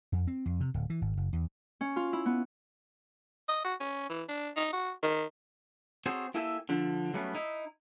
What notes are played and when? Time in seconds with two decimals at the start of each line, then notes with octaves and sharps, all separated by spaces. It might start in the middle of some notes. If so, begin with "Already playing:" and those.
0.12 F2
0.27 C4
0.46 F2
0.60 C3
0.74 D1
0.90 E3
1.01 G#1
1.17 F#1
1.33 E2
1.81 C#4
1.96 F4
2.13 E4
2.26 B3
3.49 D#5
3.64 F#4
3.80 C#4
4.09 E3
4.29 D4
4.56 D#4
4.73 F#4
5.03 D#3
6.06 C4 F#4 G#4 A4 C5 C#5
6.34 A#3 E4 G4 A4 E5 G#5
6.69 D3 F3 D4
7.14 F#3 G3 A3 B3 C#4
7.35 D#4 E4